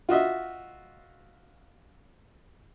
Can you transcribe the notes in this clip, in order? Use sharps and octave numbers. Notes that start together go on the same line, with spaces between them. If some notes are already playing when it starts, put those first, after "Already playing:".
F4 F#4 D#5 E5